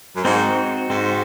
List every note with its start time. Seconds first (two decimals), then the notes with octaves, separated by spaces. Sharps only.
0.16 F#2
0.24 G#2 C4 D#4 F#4
0.90 G#2 C4 D#4 F#4